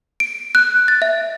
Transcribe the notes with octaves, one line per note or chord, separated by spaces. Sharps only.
D7
F#6
A6
E5